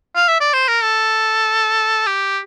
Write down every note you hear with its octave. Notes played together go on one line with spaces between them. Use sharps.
F5
E5
D5
C5
A#4
A4
G4